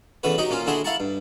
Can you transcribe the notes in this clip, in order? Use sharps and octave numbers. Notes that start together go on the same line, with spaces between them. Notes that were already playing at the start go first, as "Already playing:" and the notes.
E2 C#3 A3 F#4 B4
F#3 D#4 F#4 G4 D#5
A#2 A#3 C#4 F4
D3 A3 E4 F#4 G#4 C6
E4 F5 F#5 A5 A#5 C#6
G2